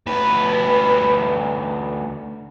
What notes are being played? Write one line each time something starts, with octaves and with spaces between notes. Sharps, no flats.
D2 B4